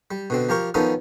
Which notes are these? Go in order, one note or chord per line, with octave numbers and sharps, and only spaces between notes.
G3
B2 D3 C4
F3 G4 A#4 C#6
D#3 F3 B3 C#4 D#4 A4